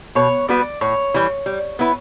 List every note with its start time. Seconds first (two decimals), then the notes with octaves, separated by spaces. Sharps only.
0.15 B2 C#5
0.49 G3 B3 F#4 B4 D5
0.81 A2 C#5
1.14 E3 G3
1.46 G3
1.79 B3 E4 B4